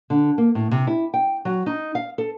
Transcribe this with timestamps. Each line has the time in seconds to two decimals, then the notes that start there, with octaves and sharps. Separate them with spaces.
0.10 D3
0.38 A#3
0.55 A2
0.71 C3
0.87 E4
1.14 G5
1.45 F#3
1.66 D#4
1.95 F5
2.18 A4